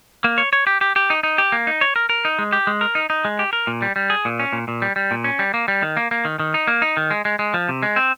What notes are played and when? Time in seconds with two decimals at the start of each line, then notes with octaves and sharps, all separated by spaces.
0.24 A#3
0.38 C#5
0.53 C#5
0.67 G4
0.81 G4
0.96 G4
1.10 D#4
1.23 D#4
1.38 G4
1.52 A#3
1.67 D#4
1.81 C#5
1.96 A#4
2.09 A#4
2.25 D#4
2.39 G#3
2.52 G4
2.67 G#3
2.81 A#4
2.95 D#4
3.10 D#4
3.25 G#3
3.39 G4
3.53 A#4
3.67 A#2
3.82 G3
3.96 G3
4.10 G#4
4.25 A#2
4.39 C#4
4.53 A#2
4.68 A#2
4.82 G3
4.96 G3
5.11 A#2
5.24 C#4
5.39 G3
5.54 A#3
5.68 G3
5.82 D#3
5.97 A#3
6.11 A#3
6.25 D#3
6.39 D#3
6.54 D#4
6.67 A#3
6.82 D#4
6.97 D#3
7.11 G#3
7.25 G#3
7.39 G#3
7.54 F3
7.69 C3
7.83 G#3
7.96 C4